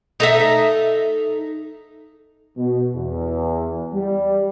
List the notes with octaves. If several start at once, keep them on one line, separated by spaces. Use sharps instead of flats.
D#4 A4 E5
B2
E2
G3